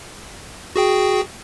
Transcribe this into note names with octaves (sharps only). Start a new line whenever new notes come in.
F#4 G#4 G5